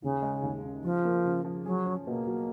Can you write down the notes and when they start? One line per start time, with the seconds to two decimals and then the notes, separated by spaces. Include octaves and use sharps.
0.02 D#2 C#3
0.22 G#3
0.43 D#2
0.63 C#3
0.83 F3 F4
1.05 A#3
1.25 C#3
1.45 F3
1.65 F#3 G#4
1.86 C#4
2.06 B2 A#3
2.27 F#3